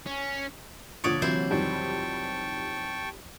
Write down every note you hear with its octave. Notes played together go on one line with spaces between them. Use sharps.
C#4
A#2 D3 F3 C#5 D5 C#6 D#6
C3 E3 F#3 E4 C5
F2 D#3 G3 G5 A5 C#6